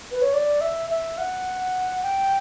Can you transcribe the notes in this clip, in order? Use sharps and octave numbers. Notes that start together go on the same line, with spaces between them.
B4
C#5
D5
E5
E5
F#5
G5